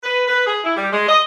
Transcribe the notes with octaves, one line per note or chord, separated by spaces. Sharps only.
B4
B4
G#4
E4
G3
G#3
D#5